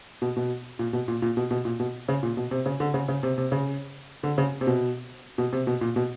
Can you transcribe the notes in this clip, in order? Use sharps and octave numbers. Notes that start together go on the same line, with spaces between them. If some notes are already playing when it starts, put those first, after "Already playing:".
B2
B2
A#2
B2
A#2
A#2
B2
B2
A#2
B2
C#3
A#2
B2
C3
C#3
D3
C#3
C#3
C3
C3
C#3
D3
C#3
C3
B2
B2
C3
B2
A#2
B2